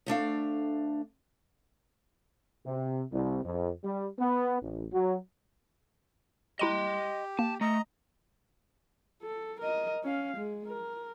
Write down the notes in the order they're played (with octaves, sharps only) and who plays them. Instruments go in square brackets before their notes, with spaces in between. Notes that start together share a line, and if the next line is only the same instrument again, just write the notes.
[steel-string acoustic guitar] D2 A3 D4 F5
[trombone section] C3
C2
F2
G3
B3
A1
F#3
[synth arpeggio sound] E4 A#5 D#7 [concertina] G4 [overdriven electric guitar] D#5 C6
[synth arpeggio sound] A#3 [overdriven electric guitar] A5
[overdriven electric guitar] A3 [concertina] D#5 A#5
[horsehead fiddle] A4
A#4 D#5
C#4 F5
G#3
A#4